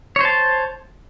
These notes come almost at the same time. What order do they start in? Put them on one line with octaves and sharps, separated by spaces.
C#5 C5 A5